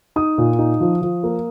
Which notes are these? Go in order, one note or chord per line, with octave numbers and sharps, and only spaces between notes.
D#4 D#6
A#2
D#4
F3
F3
A#3